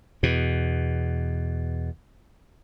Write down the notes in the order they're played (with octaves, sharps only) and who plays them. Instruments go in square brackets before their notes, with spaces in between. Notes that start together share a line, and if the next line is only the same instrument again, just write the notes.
[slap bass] E2 B2